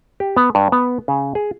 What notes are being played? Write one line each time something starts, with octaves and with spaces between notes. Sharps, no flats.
G4
B3
G2
B3
C#3
G#4